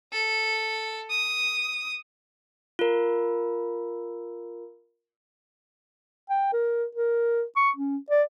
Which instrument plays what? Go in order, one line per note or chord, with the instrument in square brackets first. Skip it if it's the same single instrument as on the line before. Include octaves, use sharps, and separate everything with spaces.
[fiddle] A4
D#6
[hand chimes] F4 A#4
[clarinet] G5
A#4
A#4
C#6
C#4
D5